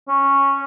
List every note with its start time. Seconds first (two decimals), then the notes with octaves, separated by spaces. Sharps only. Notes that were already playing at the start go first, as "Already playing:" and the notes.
0.08 C#4